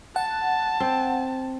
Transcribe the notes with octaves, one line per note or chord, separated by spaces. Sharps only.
F#5 A5
C4